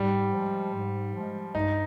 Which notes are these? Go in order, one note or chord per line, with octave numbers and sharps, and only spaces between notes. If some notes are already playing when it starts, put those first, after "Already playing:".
Already playing: G#2 G3
F3
G#3
G#2
F3 G#3
G2 D#4